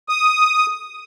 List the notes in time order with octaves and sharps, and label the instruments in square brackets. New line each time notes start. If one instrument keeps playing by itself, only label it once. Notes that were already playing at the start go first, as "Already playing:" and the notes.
[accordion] D#6